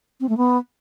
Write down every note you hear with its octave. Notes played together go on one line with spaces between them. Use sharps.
C4
A3
B3